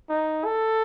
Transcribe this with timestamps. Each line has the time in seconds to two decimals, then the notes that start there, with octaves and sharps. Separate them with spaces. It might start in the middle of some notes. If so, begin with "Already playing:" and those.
0.09 D#4
0.45 A4